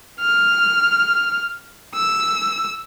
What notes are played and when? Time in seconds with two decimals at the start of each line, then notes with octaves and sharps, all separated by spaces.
0.20 F6
1.95 E6